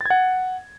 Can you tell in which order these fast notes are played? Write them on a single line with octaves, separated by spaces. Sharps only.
A6 G#6 F#5